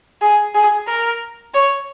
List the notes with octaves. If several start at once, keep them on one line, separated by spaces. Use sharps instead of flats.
G#4
G#4
A#4
C#5